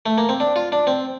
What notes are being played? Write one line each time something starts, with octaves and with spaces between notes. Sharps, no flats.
A3
A#3
C4
D4
F4
D4
C4